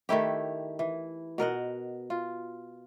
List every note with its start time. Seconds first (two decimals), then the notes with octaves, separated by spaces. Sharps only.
0.09 D#3 A3 E4 G4
0.79 E3
1.38 B2 A#4 D#5 F#5
2.10 F4